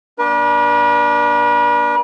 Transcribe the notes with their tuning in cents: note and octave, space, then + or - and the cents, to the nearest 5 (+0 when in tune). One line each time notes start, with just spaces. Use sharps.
A#3 +40 D4 +0 B4 -45